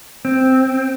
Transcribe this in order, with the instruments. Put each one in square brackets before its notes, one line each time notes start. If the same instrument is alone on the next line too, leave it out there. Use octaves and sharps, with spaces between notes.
[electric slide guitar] C4